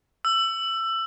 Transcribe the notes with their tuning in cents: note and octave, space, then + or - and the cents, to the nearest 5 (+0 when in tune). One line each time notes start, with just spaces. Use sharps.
E6 +20